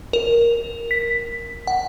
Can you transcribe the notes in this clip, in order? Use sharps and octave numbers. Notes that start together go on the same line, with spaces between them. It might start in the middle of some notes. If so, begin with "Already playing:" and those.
A#4
B6
F#5